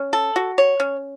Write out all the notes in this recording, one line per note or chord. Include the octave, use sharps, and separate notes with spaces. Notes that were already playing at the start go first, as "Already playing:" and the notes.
Already playing: C#4
A4
F#4
C#5
C#4